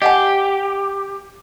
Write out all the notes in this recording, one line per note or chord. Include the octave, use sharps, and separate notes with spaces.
G4 D#5 F#5 G#5